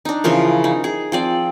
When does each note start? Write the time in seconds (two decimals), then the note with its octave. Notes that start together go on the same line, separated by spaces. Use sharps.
0.05 D4 D#4
0.24 C#3 E3 F3 A#4
0.64 D#4
0.84 G#4
1.12 F3 C4 D5